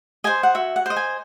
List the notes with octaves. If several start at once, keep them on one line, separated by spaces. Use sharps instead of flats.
C5 D#5 G#5
F#5
F#4 E5
F#5
C5 D#5
G#5